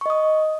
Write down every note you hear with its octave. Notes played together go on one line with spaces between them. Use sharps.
D#5 C#6 D#6